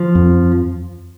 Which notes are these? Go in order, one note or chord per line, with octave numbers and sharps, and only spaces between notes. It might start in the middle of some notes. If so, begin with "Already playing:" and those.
Already playing: F3
F2